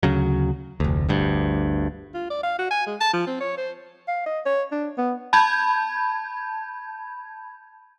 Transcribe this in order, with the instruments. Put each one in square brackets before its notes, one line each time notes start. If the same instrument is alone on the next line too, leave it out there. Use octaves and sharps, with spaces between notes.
[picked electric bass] D2 C#3 F#3
F1 D2
G1 D2 G2
[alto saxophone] F4
D5
F5
F#4
G#5
G#3
A5
F3
C4
C#5
C5
F5
D#5
C#5
D4
B3
[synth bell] A5 B5 G6 G#6